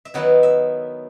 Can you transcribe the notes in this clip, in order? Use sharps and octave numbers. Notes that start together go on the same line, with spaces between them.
E5
D#3 F#3 B3 E4 F#5
E5